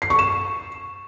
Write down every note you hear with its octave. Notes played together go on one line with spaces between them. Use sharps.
C7
C#6
E7